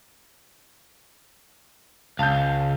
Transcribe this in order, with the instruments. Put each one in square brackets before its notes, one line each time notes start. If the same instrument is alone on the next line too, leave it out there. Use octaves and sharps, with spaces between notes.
[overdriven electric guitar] C#2 [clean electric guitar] F5 [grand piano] A5 G6